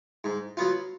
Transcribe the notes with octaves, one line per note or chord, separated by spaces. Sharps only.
G#2
F#3 B3 F4